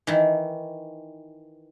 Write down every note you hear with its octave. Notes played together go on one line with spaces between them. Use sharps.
D#3 E3